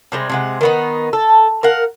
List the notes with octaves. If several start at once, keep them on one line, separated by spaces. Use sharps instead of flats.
C3 G3 G#3
C3 G#3 F#5
D#3 B3 D#4
A4
A#4 F5 F#5